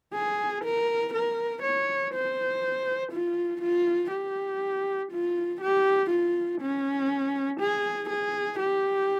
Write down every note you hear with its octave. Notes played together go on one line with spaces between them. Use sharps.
G#4
A#4
A#4
C#5
C5
F4
F4
G4
F4
G4
F4
C#4
G#4
G#4
G4